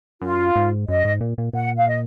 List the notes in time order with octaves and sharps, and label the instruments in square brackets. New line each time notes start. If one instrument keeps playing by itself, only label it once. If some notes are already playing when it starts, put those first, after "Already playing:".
[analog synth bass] F#2 [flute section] F4
[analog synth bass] G#2
[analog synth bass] F#2 [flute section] D#5
[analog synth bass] G#2
A#2
A#2
[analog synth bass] A#2 [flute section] F#5
[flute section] F5
D#5